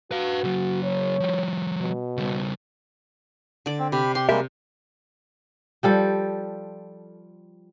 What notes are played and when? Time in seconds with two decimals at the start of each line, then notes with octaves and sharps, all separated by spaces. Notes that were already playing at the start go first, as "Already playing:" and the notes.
0.11 F#4 B4 F5
0.44 C#3 F#3
0.83 C#5
1.20 F3 G3
1.80 B2
2.17 C#3 G3
3.66 D3 D5
3.79 C4
3.92 C3 G4 B5
4.15 G4 C6
4.29 G3 G#3 A#3 G4 A#4 E5
5.83 F3 G3 A4